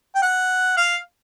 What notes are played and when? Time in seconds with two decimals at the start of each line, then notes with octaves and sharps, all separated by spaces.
0.15 G5
0.22 F#5
0.77 F5